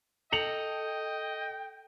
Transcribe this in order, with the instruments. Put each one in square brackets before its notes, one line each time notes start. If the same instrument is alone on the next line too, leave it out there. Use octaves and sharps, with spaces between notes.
[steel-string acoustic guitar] A4 [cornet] D#5 [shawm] G5 [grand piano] C#7 F7 F#7